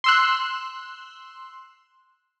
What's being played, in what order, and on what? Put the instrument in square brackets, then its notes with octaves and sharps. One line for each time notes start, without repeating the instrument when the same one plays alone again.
[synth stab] C6 E6 F#6